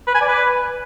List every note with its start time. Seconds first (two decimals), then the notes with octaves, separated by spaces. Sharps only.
0.07 B4
0.14 G#5
0.21 D5
0.28 B4